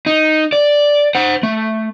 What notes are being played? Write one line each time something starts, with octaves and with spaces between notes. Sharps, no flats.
D#4
D5
C5 F#5
A3